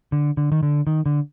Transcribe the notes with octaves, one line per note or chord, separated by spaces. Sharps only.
D3
D3
D#3
D3
D#3
D3